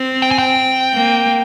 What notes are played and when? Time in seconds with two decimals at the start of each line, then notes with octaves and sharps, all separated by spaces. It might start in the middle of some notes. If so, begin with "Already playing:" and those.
Already playing: C4
0.22 G5
0.31 G#5
0.38 G5
0.93 A#3